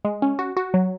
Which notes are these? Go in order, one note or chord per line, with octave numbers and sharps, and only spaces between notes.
G#3
C#4
F#4
F#4
F#3